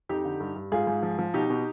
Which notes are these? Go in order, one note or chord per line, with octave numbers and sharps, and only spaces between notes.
F2 D#4 G4
D3
G2
G2
G#2 F4 G#4
G#2
F3
F3
B2 D#4 G4
B2